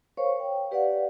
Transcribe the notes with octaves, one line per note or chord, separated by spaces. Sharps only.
A#4 C5 C#5 F5 C#6
G5
G4 B4 C#5 D5 F5 F#5